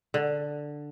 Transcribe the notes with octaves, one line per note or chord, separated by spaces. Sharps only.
D3